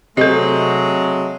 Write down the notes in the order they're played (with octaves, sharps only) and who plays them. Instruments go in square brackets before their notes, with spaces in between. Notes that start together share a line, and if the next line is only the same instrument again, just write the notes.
[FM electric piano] C3 [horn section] F#3 G#3 A3 [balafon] A4 D#5